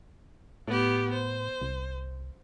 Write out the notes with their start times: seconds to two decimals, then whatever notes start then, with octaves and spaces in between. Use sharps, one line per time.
0.68 A2 B3 G4
1.13 C5
1.61 C2